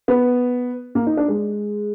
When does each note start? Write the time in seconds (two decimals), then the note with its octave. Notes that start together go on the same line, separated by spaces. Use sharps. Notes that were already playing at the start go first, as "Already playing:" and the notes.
0.08 B3
0.95 A#3
1.07 D#4
1.17 D4
1.28 G#3